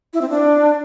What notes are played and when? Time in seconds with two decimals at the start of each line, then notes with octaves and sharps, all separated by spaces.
0.13 E4
0.21 C4
0.29 D4